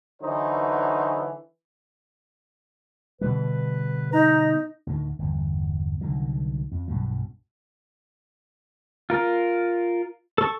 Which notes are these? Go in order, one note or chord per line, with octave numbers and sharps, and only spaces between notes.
D3 E3 F#3 D#4 F#4 C5
B2 D3 G3 B4
D#4 A#5
D2 A2 D#3
G1 E2
C2 D3 D#3 F#3
F2
B1 G2 B2 F#3
F4 A#4
A4 C#6